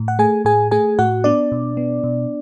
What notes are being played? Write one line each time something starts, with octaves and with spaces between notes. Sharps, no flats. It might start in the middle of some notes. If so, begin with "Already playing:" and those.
Already playing: A2
F#5
A3 G#4 G#5
A2 G#4 G#5
A3 G#4 G#5
A2 F#4 F#5
B3 D4 D5
B2
B3
B2